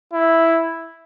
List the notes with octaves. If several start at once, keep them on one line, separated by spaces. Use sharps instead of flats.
E4